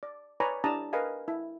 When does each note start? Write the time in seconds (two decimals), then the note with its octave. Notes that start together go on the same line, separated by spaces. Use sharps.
0.03 D5
0.40 B4 C#5 D5 G#5 A#5 B5
0.64 D4 E4 G4 A5 A#5 D#6
0.93 A#4 B4 D#5 F5 G#5
1.28 E4